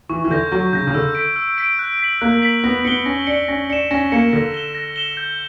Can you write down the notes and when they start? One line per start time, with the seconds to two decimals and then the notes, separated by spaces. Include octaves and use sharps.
0.09 E3 C#6
0.24 E3
0.30 D3 G6 A#6
0.52 F#3 C#6
0.73 C#3 G6 A#6
0.87 C#3
0.94 D3 E6
1.15 B6 D7
1.36 E6
1.57 B6 D7
1.79 F#6
2.00 B6 F#7
2.21 A#3 F#6
2.42 B6 F#7
2.64 B3 A#6
2.85 B3 C#7 G7
3.06 C#4 A#6
3.27 D4 C#7 G7
3.48 C#4 A#6
3.70 D4 C#7 E7
3.91 C#4 A#6
4.12 A#3 C#7 E7
4.33 D3 A#6
4.54 E7 G7
4.75 A#6
4.96 E7 G7
5.17 G6